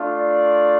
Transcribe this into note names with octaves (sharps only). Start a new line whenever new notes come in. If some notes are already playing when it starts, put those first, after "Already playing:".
Already playing: A3 D4 F4
D5